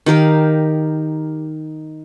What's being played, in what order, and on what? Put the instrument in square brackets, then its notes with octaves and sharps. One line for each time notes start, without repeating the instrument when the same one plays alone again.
[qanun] D#3 G4 A#4 F5